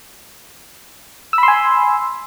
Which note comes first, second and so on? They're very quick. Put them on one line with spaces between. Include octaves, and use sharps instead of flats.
E6 B5 C6 G#5